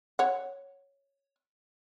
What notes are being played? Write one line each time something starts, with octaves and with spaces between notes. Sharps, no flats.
C#5 F#5